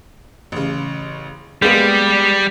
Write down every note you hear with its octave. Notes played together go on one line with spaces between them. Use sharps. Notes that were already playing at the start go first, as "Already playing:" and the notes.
A1 C#3
G3 G#3 A#3 B3